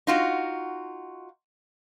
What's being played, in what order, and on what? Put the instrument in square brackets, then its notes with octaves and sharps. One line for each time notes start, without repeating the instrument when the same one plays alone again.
[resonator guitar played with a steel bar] D#4 F4 F#4